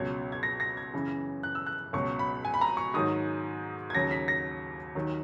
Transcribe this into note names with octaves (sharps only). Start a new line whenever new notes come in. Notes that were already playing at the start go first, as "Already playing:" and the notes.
Already playing: C#2 B2 F#3 G#6
G#6
A#6
A#6
G#6
F#2 C#3 E3
F#6
E6
F#6
C#2 B2 F#3 C#6
B5
G#5
B5
A#5
C#6
G#2 D#3 F#3 D#6
G#6
D#2 C#3 F#3 A#6
B6
A#6
D#2 D#3 F#3